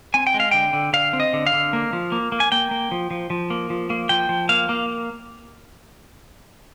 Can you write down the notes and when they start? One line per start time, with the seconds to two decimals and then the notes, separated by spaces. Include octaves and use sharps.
0.14 C4 G#5
0.27 G5
0.34 G#3
0.40 F5
0.51 D3 G5
0.73 D3
0.93 D3 F5
1.13 C4
1.20 D#5
1.33 D3
1.46 F5
1.53 D3
1.73 A#3
1.93 F3
2.12 A#3
2.32 A#3
2.40 G#5
2.52 A#3 G5
2.71 A#3
2.91 F3
3.11 F3
3.30 F3
3.50 A#3
3.70 F3
3.90 A#3
4.09 F3 G5
4.29 F3
4.49 A#3 F5
4.69 A#3